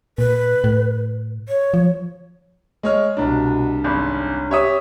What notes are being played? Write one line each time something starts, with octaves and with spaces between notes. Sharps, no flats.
A#2 B4
A2
C#5
F3
G#3 C#5 F6
C2 B2 D4
G#1 C#4
G4 C#5 E5 D#6